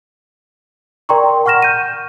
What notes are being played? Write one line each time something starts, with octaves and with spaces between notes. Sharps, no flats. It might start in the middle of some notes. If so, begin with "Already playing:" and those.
A#4 D5 G5 A#5 C6 C#6
F#5 C#6 F6 A#6 E7
G6 D#7